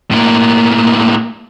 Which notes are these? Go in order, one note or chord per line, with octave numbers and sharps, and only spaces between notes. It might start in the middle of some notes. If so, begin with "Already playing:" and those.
A2 A#3